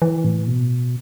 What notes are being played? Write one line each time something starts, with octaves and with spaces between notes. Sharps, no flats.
E3
A2
B2